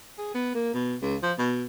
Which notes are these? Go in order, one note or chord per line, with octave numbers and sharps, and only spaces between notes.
G#4
B3
A#3
B2
C#2
F3
B2